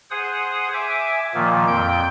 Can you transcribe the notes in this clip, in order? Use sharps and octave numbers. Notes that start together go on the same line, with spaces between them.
G#4 C5 F#5 D#6
E5 G#5 D6
A#2 D#3 F3 A#3
F2 G5 G6